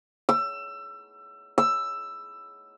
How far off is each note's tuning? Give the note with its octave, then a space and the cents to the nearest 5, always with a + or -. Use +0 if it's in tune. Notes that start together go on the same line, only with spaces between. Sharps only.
E6 +25
E6 +10